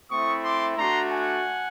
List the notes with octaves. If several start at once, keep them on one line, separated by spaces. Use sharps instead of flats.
A3 C4 E4 C#6 D#6
C6 D6
A3 D4 F#4 A#5 C6
F#5 G#5